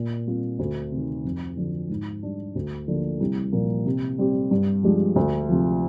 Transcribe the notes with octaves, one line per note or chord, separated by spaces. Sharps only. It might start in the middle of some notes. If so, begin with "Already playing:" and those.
Already playing: A#2
G3 C4 F4
D2
C3 D#3
F2
D3 F3
G#2
G3 D4
D2
D3 F3 A#3
C2
A#2 F3 A#3
C3
G3 C4 G4
G2
F3 G#3 D4 G4
D2
C3 F3